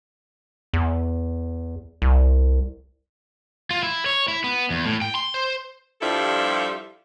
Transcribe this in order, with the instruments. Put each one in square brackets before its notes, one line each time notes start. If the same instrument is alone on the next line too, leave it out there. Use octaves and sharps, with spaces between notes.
[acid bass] E2
C2
[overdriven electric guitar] F4
E4
C#5
E4
B3
E2
A2
G5
C6
C5
[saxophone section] G2 F3 G3 E4 F4 A4